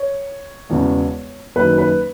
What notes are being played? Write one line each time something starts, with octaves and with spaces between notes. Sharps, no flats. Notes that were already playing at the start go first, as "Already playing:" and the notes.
Already playing: C#5
E1 E2 C#3 E3
F#1 F#2 D#3 B4
B4